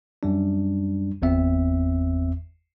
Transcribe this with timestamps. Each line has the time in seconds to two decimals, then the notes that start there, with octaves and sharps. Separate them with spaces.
0.23 F#2 G3 D4
1.22 G1 E2 C4 E5